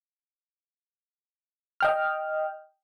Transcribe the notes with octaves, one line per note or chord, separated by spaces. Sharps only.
D#5 G5 F6